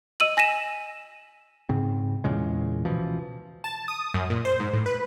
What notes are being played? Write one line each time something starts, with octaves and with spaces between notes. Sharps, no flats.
D#5 E6 D#7 F#7
G#5 A#6 B6 D#7 E7
G#2 C#3 C4
E2 A#2 C#3 G#3
C#2 B2 E3 F3
A5
D#6
F#2
A#2
C5
G#2
A2
B4